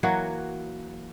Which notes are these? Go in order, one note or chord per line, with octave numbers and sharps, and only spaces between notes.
E3 F#3 A#3 F#4